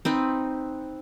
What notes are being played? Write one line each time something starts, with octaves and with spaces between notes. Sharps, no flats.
C4 D#4 B4